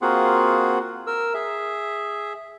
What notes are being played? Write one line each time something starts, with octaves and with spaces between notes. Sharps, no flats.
A#3 C4 F4 F#4 G#4 F#5
A#4 E6
G#4 E5